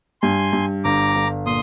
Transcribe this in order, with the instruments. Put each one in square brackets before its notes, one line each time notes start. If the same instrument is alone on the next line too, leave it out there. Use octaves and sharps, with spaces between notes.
[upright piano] G2 [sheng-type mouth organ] G#5 C6
[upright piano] G2
[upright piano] G1 [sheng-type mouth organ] A#5 D6
[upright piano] G1
[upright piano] A#2 [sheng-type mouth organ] C6 D#6